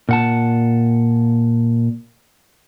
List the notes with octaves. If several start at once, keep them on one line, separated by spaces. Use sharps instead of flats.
A#2 F#5 A5